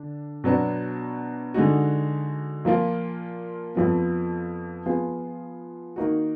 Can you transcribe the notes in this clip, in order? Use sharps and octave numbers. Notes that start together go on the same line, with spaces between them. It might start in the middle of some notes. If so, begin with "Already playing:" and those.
Already playing: D3 D4
B2 F#3 B3 D4 F#4
D3 G#3 D#4 F#4
A#2 F3 A#3 F4
F2 F3 B3
F3 B3 F4 G#4
D#3 A#3 D#4 F#4